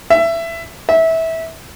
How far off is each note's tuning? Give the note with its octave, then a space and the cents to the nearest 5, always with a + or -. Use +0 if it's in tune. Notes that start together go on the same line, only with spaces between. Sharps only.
E5 +20
E5 -20